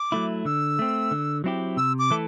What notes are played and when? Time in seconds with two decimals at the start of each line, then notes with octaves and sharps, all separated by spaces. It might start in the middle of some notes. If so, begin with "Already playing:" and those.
Already playing: D6
0.12 F#3 A3 E4
0.45 D3 E6
0.79 A3 C4
1.11 D3
1.44 F#3 C4 E4 G4
1.77 C3 E6
1.99 D6
2.10 E3 A3 E4 A4